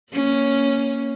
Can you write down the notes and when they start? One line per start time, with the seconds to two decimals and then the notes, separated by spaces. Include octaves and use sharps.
0.12 A#3 C#4